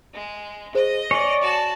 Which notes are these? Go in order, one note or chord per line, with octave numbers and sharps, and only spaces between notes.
G#3
G#4 C5 D#5
C#5 D5 G#5
F#4 A5